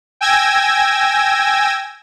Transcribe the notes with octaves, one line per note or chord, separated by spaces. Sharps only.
G5 G#5 E6 G#6 A#6